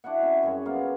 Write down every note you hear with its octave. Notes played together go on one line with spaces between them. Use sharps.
D4 E4 F#4 F#5
C4 C#4 E5
F#2 G3 G#4 C#5
A#3 B3 F4 F5